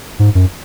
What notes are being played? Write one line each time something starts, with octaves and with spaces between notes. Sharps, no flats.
G#2
F#2